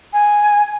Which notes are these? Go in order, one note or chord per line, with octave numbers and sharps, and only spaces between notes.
G#5